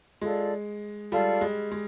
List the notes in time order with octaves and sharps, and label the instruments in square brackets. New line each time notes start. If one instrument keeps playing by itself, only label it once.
[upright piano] G#3 [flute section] F4 A4 D5
[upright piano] G3 [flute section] F4 A4 D5
[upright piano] G#3
G#3